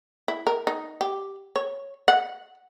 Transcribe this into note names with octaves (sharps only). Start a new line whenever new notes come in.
E4
A#4
D#4
G4
C#5
F#5